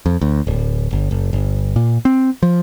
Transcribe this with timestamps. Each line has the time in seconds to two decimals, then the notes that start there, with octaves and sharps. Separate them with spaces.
0.06 F2
0.21 D2
0.47 D1
0.93 G1
1.11 F#1
1.33 G1
1.76 A#2
2.05 C4
2.43 F3